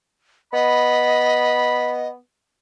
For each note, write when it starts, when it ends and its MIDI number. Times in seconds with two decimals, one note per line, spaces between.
0.53 2.15 59
0.53 2.08 75
0.53 2.02 83